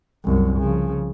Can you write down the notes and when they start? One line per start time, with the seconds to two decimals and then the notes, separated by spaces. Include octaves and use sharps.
0.25 C2 F#2
0.59 C#3 F3